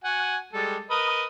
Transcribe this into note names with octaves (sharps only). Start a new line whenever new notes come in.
F#4 F#5 G#5
G3 G#3 A4
A#4 B4 D#5